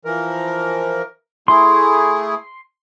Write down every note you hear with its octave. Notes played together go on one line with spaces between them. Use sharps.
E3 F3 A#4
A3 E4 G#4 C6